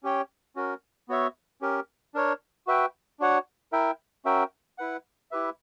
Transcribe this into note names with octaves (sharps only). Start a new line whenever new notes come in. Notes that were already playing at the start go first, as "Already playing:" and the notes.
C#4 G4 C#5 G5
C#4 F#4 A#4
B3 F#4 C#5 E5
C#4 G4 A#4
D4 A#4 C#5
F#4 B4 E5 G5
D4 F#4 C#5 F#5
E4 A#4 E5 G5
C#4 F#4 A#4 E5 G5
E4 B4 F#5
E4 G4 B4 E5